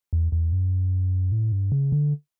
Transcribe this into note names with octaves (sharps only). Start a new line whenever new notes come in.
E2
E2
F#2
A2
G2
C#3
D3